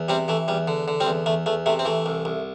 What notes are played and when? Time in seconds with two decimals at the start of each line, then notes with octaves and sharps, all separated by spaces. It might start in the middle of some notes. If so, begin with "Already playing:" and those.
Already playing: E2
0.08 C3 G3 C4
0.28 E3 A3
0.48 E2 G3
0.68 D3
0.88 D3
1.00 G3 C4
1.07 E2
1.26 E2 A3
1.46 E2 A3
1.66 C3 A3
1.79 C4
1.85 E3 A3
2.06 C2
2.25 C2